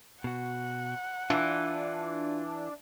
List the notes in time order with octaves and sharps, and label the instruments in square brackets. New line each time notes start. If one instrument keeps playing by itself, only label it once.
[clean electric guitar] B2 F#4 [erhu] F#5
[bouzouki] E3 [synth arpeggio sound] D4 [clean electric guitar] F4